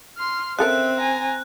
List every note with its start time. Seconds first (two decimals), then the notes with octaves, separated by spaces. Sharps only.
0.17 C6 F6
0.59 C#3 C4 A4 A#4 E5 F#6
0.98 G#5 A#5